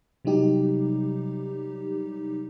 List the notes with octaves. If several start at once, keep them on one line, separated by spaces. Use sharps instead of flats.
C3 F#3 G3 D#4 G4